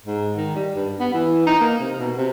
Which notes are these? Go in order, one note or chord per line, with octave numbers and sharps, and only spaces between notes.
G#2
D#3
G3
G2
B3
E3
D#4
A#3
C3
B2
C3